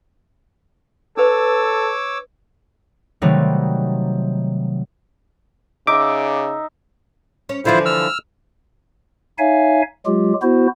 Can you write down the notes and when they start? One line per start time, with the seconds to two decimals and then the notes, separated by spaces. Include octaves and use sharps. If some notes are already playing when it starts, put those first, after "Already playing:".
1.17 D4 A4 B4 C#5 D6 E6
3.22 C3 D#3 F#3 G3 A3 D#4
5.87 C#3 D#4 E5 D6
7.49 C#4
7.65 D3 E3 F3 E4 F4 C5
7.85 E6 F6
9.39 D#4 C#5 E5 F5 G#5
10.06 F#3 G#3 F4 G4
10.42 B3 E4 F#4 C5